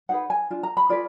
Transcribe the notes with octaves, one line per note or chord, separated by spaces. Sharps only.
D#4 G#4 B4 F#5
G#5
D4 F4
A#5
B5
F4 G#4 B4 D5